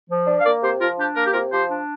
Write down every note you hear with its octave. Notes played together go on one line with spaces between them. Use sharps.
F3
D4
F5
A#3 A#4 D5
C3 G4 C5
F3 F4 A#4
D4 G4
A#3 A#4
G4
C3 F4 A#4
F3 G4 C5
D4